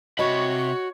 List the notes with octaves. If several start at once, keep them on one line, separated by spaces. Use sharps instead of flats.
C3 F#4 C#5 D#5 B5